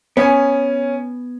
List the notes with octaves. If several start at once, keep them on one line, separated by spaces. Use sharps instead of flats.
B3 C#4 G#5